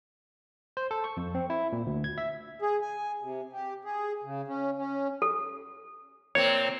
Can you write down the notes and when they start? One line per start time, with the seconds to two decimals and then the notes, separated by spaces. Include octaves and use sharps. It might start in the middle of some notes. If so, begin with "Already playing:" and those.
0.77 C5
0.91 A4
1.04 C#6
1.17 F2
1.35 C4
1.50 E4
1.72 A#2
1.86 D2
2.04 G#6
2.18 E5
2.62 G#4
2.82 G#5
3.22 C3
3.53 G4
3.85 G#4
4.24 C#3
4.47 C#4
4.77 C#4
5.22 A4
6.35 A#2 A#3 C4 C#5